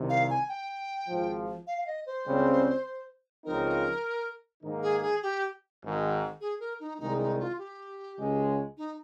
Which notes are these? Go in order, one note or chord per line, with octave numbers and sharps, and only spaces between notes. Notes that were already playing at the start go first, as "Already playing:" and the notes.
Already playing: C2 C3 D#3
F5
G#5
G5
G#1 G#2 F3
F5
F5
D#5
C5
C#2 C#3 G3 C4
C#2 C#3 F3 C4 D#4 A#4
G#2 D#3 A#3 D#4
G#4
G#4
G4
G#1 G#2 D#3
G#4
A#4
D#4
C2 C3 D#3 G#3 D#4
D#4
F4
G4
C#2 C#3 G#3
D#4